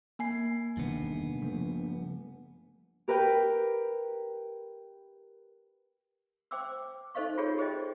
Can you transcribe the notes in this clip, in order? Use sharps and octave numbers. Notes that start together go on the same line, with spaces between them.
A#3 G#5 C7
E1 G2 C3 D#3 B3
C#3 F3 A3
G4 A#4 B4 G5
C5 G5 D6 E6
D#4 A4 C5 D#5 F5 C#6
F4 F#4 G#4 A4 C#5
G4 G#4 C5 D5 D#5 G5